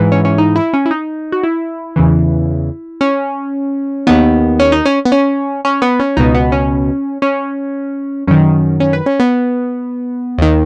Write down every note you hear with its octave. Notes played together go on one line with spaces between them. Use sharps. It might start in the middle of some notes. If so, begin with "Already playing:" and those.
Already playing: G#2 E3
C#4
C#4
D#4
E4
C#4
E4
D#4
F#4
E4
E2 C#3 E3
C#4
D#2 D#3 B3
C#4
D#4
C#4
B3
C#4
C#4
B3
C#4
C#2 B2 D#4
B3
C#4
C#4
F#2 D#3 C#4
C#4
B4
C#4
B3
D#2 D#3